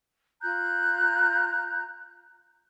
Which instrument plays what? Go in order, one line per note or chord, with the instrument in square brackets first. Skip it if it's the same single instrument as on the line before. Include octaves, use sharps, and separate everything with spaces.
[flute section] F4 A#5 F#6 G6